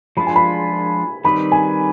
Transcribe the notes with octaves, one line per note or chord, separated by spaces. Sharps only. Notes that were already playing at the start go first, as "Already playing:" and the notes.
F3 G#3 D4 F4 B5
G#5
B5
D#3 G3 C4 D#4 B4 B5
G#5